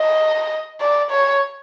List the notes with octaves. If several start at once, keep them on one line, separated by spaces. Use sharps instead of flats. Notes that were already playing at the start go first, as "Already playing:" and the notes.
Already playing: D#5
D5
C#5